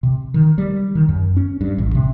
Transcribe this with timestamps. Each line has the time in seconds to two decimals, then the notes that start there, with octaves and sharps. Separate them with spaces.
0.03 C3
0.34 D#3
0.58 G3
0.95 D#3
1.09 F#2
1.37 C#4
1.61 G2
1.78 A1
1.95 C3